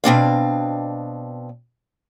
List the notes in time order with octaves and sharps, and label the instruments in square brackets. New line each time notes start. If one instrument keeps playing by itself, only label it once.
[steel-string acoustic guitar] B2 C4 D4 F5